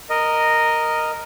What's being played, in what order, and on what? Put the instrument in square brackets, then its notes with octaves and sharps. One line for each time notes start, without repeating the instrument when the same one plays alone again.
[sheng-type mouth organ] A#4 D#5